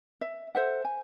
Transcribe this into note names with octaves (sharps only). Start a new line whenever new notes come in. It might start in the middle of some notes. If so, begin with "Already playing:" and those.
E5
A4 C5 E5 F#5
G#5